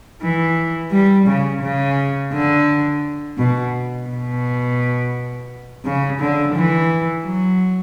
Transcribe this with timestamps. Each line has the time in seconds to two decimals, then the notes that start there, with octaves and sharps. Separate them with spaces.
0.22 E3
0.92 G3
1.27 C#3
1.62 C#3
2.33 D3
3.38 B2
4.09 B2
5.85 C#3
6.20 D3
6.55 E3
7.26 F#3